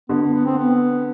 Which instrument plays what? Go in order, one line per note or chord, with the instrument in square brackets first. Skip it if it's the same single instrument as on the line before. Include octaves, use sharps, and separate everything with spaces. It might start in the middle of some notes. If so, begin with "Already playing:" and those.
[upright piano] D3 [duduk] B3
[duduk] B3
B3
C4
B3